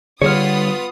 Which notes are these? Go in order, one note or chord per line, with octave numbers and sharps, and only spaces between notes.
D3 G3 B3 F4 G#4 C#5 D#6 F6